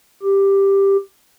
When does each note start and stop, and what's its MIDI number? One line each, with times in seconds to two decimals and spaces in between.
0.22 0.97 67